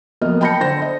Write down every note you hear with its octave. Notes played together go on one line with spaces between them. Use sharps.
F2 F#3 A#3 B3 D#5 F6
G5 A5 B5 G6 A#6 C#7
D3 C5 A#6
D#5